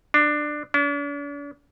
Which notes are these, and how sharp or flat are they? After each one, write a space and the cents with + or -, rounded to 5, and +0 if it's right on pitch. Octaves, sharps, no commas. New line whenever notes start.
D4 +15
D4 -45